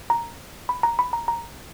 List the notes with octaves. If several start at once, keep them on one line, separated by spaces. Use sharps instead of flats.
A#5
B5
A#5
B5
A#5
A#5